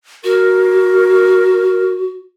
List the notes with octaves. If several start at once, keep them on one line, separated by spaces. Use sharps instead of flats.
F#4 A#4